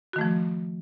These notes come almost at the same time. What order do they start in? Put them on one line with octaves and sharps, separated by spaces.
F#4 D#3 A3 F3